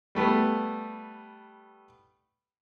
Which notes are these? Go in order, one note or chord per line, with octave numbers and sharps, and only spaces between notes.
G3 A3 B3